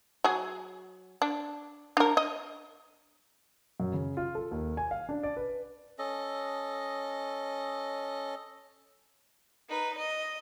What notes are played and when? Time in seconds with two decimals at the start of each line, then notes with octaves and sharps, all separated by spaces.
0.24 F#3 G#4
1.22 D4
1.97 D4 A#4
2.17 D#5
3.80 F#2
3.94 C#3
4.17 F4
4.35 A4
4.51 D#2
4.77 G#5
4.91 F5
5.09 D4
5.23 D5
5.37 B4
5.99 C#4 A4 D#5
9.68 D#4 B4
9.98 D#5